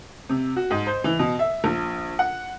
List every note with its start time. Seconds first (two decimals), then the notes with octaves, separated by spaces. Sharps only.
0.29 C3
0.56 F#4
0.71 G#2
0.87 C5
1.04 E3
1.19 B2
1.39 E5
1.64 A#1
2.19 F#5